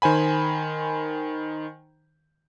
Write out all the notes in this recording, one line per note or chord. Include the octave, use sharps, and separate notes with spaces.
D#3 C5 G#5 B5